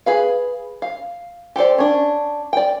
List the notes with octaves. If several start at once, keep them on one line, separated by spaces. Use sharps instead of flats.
G#4 B4 F5
F5
G4 A4 C5 D5
C#4 D4
D5 G5